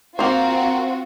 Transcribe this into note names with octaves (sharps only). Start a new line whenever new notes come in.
A#3 C4 F4 F#4 C5